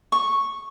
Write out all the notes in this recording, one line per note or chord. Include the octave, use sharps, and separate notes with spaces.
C#6